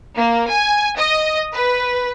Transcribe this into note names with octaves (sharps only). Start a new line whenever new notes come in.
A#3
G#5
D#5
B4